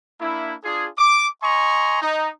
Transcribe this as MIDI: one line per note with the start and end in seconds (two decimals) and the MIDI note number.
0.21 0.55 58
0.21 0.55 62
0.21 0.55 64
0.63 0.87 62
0.63 0.87 65
0.63 0.87 68
0.99 1.26 86
1.43 2.00 75
1.43 2.00 80
1.43 2.00 82
1.43 2.00 84
1.43 2.00 85
2.02 2.30 63